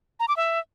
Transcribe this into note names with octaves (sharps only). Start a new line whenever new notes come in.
A#5
D6
E5